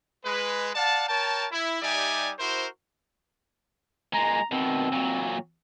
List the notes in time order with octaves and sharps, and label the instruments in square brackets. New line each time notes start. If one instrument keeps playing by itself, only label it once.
[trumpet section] G#3 B4
D5 F5 F#5 A5
A#4 C#5 G5 A5
E4
G3 D#4 G4 D5 E5 G#5
E4 F#4 A#4 C5
[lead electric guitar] A#2 G#3 [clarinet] A#5
[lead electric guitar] B2 D#3 [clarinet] C4
[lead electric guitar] A#2 F#3